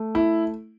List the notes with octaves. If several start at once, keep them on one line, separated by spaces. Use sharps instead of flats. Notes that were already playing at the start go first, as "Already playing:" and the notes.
Already playing: A3
E4